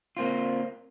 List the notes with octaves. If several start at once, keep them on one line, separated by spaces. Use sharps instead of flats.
A#3 C4 F4